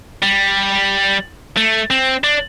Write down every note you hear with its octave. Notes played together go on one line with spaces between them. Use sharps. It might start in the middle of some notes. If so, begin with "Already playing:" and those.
G3
A3
C4
D4